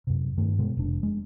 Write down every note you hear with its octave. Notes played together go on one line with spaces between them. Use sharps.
F#2 C3
G2 D#3 A3
B2 G#3
F1 D4
G#3